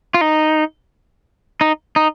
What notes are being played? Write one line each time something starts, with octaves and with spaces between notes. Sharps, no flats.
F4
D#4
D#4
D#4